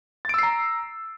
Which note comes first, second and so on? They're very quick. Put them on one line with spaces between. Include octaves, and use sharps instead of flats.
A6 D7 E6 C7 A#5